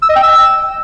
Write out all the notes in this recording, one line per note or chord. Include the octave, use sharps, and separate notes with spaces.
E6
D#5
G5
E6